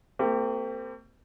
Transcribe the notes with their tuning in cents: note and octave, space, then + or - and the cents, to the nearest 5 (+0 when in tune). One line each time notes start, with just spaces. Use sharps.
A3 +45 C4 -35 G4 +0